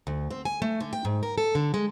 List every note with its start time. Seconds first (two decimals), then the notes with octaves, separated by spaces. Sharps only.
0.07 D2
0.31 C4
0.45 G#5
0.62 A3
0.80 D3
0.93 G5
1.05 G#2
1.23 A#4
1.38 A4
1.55 D3
1.74 G#3